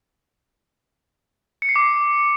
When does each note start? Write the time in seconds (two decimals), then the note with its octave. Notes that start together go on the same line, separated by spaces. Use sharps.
1.62 C#7
1.69 C7
1.76 D6